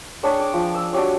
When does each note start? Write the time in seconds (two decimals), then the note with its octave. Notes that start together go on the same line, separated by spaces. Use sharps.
0.23 D4 G#4 C#5 G5
0.40 D6
0.53 F3
0.74 E6
0.93 D4 F#4 G4 C#5